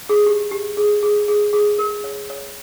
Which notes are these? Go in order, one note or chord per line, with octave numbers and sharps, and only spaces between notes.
G#4
G4
G4
G#4
G#4
G#4
G#4
A#4
C#5
C#5